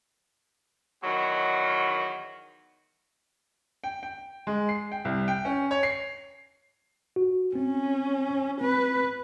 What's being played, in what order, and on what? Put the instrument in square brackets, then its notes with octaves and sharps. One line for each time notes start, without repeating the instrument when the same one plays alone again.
[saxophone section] E2 D#3 F#3
[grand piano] G5
G5
G#3
C7
G5
C2
G5
C#4
C#5
C7
[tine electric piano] F#4
[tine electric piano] C4 [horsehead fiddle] C#4
[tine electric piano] C4 [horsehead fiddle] B4